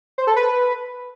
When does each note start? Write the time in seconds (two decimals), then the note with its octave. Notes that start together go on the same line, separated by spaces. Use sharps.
0.18 C5
0.27 A4
0.36 B4